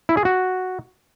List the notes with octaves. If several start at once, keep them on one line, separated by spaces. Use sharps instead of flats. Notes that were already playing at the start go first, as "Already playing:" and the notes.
E4
G#4
F#4